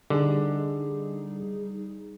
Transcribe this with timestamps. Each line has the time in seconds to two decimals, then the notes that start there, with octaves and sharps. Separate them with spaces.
0.10 D3 G3 D#4 G#4